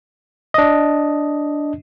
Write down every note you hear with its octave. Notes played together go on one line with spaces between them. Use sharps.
D4 D#5